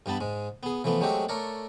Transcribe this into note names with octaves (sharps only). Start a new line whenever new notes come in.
G2 G3 B3 A5 B5
G#2 G#3
B3 G#4
E3 F3 A3 B3
F#3 G#3 A3 C4 F#4 G4
A3 A4 A#4 C#5 D5